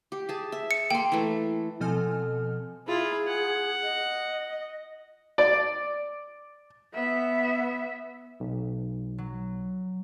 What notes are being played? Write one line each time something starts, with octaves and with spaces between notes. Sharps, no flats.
G4
G#4 A5
E5
C#7
A#3 G5 C6
E3 A3
B2 F3 C4 A4 G#5 F6
E4 F4 G#4
F#5
D#5
D5
B3 E5
B1
F#3